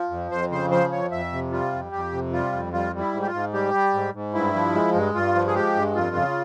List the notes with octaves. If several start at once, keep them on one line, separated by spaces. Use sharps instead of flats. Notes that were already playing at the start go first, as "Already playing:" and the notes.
Already playing: F3
F2
F2 C5
C#3 C5
F3 C5
F2 C#5
F2 E5
C3
G3 F4
F2
F2 G4
C3
G3 F4
F2
G3 F4
G3
E4
G#2
G4
F4
G#2
G3 G4
G3
G#2
G#2
G2 E4
F3
G#3
G2
G2 F4
F3
G#4
G#3 G4
G2
F2 F4
C#3